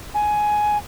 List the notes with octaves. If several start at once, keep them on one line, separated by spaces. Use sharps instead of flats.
G#5